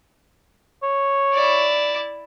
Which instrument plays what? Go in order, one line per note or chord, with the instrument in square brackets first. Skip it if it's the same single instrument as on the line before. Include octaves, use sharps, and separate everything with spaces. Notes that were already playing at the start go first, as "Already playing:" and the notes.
[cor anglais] C#5
[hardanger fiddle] E4 D5